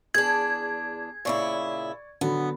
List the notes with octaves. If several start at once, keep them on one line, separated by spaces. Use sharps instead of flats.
E2 D4 G#4 G#6
A#2 C#3 E4 D5 C#6
D3 F#3 B3